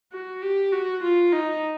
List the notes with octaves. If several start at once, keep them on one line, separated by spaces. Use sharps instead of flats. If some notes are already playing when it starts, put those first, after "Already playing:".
F#4
G4
F#4
F4
D#4